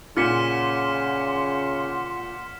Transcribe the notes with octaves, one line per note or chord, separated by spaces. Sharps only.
A#2 C#3 F#5 C6 F6 B6 C#7 E7